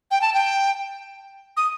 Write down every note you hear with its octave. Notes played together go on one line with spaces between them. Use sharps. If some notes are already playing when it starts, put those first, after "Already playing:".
G5
A5
G5
D#6